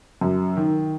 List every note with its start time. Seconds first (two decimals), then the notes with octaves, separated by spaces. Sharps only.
0.21 F#2
0.57 D#3